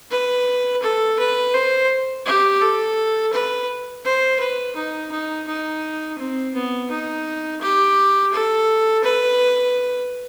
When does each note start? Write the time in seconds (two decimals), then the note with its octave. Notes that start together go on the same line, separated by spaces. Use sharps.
0.11 B4
0.82 A4
1.19 B4
1.54 C5
2.26 G4
2.61 A4
3.32 B4
4.05 C5
4.39 B4
4.76 D#4
5.11 D#4
5.47 D#4
6.18 C4
6.54 B3
6.90 D#4
7.61 G4
8.33 A4
9.03 B4